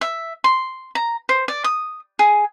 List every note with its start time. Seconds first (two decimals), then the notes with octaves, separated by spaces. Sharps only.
0.01 E5
0.44 C6
0.95 A#5
1.29 C5
1.48 D5
1.64 D#6
2.19 G#4